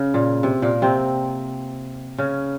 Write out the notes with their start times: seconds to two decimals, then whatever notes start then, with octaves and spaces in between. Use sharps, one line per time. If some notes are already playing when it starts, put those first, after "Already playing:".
Already playing: C#3
0.14 A#2
0.43 C3
0.62 A#2 A#3
0.82 C3 C4
2.18 C#3 C#4